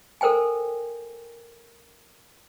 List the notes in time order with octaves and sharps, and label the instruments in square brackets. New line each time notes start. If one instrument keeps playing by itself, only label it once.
[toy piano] A4 A#4 C5 G5 G#5